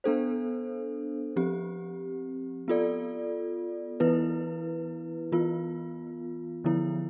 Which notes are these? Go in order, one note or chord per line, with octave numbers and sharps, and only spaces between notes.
B3 D4 A4 C5
F3 C4 G4
B3 F4 A4 D5
E3 B3 E4 B4
E3 B3 F4
D3 F3 B3 E4